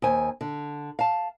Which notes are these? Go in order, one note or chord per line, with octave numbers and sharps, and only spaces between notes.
D#2 C5 G#5
D3
F5 A5